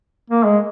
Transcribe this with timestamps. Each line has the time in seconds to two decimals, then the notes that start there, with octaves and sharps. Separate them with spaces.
0.30 A#3
0.44 G#3